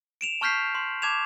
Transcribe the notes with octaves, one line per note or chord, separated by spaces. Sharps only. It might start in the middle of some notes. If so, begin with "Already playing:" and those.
D7 E7 F7
A5 C#6 F6 G6 B6 C7
C6
A5 D6 G#6 E7 F7